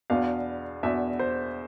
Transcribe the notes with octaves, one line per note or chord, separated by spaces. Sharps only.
E2 B2 B3 D4 F5
E2 B2 B3 D4 E5
C5